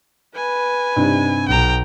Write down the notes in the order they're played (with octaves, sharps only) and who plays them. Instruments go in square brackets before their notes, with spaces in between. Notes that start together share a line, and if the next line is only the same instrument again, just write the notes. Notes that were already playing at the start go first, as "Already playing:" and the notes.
[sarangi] B4 [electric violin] G#5
[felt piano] G2 C3 D#4
[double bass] B1 [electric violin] G5 A#5